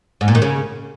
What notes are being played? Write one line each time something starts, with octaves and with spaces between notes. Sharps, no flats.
G#2
A#2
D#3
C#3